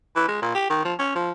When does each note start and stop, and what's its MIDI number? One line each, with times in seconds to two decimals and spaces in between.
0.16 0.26 52
0.28 0.41 56
0.42 0.52 46
0.55 0.69 67
0.70 0.81 51
0.85 0.94 53
0.99 1.15 61
1.15 1.31 53